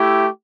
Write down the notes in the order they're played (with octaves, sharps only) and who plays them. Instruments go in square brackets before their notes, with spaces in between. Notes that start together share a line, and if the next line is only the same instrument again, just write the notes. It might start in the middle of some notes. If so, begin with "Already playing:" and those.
Already playing: [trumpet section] A3 E4 G4